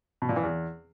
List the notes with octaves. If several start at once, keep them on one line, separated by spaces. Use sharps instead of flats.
B2
A#2
E3
E2